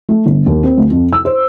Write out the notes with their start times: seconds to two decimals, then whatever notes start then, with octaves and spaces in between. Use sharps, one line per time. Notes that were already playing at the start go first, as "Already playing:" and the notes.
0.09 A3
0.26 G1
0.46 D#2
0.63 C4
0.77 D2
0.90 F2
1.13 E6
1.25 C5